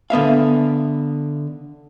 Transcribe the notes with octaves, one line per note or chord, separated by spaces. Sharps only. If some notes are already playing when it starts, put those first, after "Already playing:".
D3 B3 E5 F5